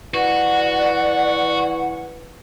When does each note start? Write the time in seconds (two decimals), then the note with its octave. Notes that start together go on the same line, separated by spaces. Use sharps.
0.14 E3 F#4 D5 F#5